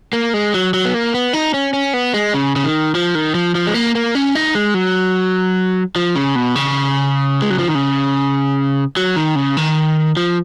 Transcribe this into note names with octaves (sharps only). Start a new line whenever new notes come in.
A#3
G#3
F#3
F#3
B3
A#3
B3
D#4
C#4
C#4
B3
G#3
C#3
C#3
D#3
F3
D#3
F3
F3
G#3
A#3
A#3
C#4
D#4
G#3
F#3
F3
C#3
B2
C#3
G#3
F#3
F3
D#3
C#3
F#3
D#3
C#3
D#3
F3